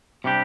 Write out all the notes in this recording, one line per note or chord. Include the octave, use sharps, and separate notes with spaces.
C3 G3 D4 G4